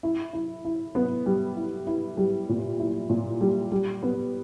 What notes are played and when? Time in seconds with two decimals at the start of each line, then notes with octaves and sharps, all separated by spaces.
0.03 E4
0.33 E4
0.65 E4
0.95 B3
1.26 G3
1.56 E4
1.87 E4
2.17 G3
2.49 A#2
2.79 E4
3.10 A#2
3.41 G3
3.72 G3
4.03 B3